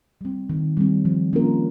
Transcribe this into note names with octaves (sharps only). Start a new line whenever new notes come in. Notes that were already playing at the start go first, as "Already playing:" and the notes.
G3 C4
D#3
G3 C4
F3
A#3 C#4 F4 A#4